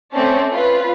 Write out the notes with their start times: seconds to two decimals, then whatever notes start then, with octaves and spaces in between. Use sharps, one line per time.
0.12 A3 C4 C#4 D5 A5
0.52 F4 B4